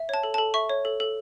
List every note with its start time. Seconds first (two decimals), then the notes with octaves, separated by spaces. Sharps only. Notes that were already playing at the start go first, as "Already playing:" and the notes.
Already playing: E5
0.09 C#5 A5
0.23 A4
0.34 A4 A5
0.54 E5 C#6
0.70 C#5
0.85 A4
1.00 A4